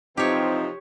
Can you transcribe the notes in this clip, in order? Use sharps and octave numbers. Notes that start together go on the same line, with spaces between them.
C3 E3 F3 C4 D#4 G4 C#5